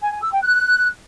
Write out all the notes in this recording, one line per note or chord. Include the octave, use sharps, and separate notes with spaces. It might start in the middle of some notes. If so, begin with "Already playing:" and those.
G#5
G#5
E6
G5
F#6